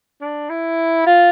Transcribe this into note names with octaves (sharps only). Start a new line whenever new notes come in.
D4
E4
F4